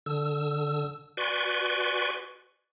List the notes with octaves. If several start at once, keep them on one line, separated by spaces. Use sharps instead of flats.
D3 E6
F#4 B4 D5 G#5 C6 C#6